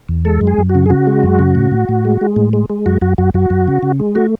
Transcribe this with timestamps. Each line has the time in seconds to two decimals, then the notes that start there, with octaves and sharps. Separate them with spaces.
0.09 E2
0.25 G#3 A4
0.41 F#2
0.47 G#4
0.58 F#2
0.69 F#4
0.75 C#3
0.86 G#4
0.90 C#3 F#4
1.07 G#3
1.23 F#2
1.39 C#3
1.55 A2
1.71 A2
1.89 A2
2.05 G#3
2.21 G#3
2.36 A2
2.53 G#3
2.70 G#3
2.86 F#2 F#4
3.02 F#2 F#4
3.18 F#2 F#4
3.34 F#2 F#4
3.50 F#2
3.68 C#3
3.83 C#3
4.00 G#3
4.15 A3 F#4